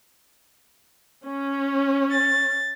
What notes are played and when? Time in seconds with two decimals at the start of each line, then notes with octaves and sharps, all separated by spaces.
1.23 C#4
2.11 A6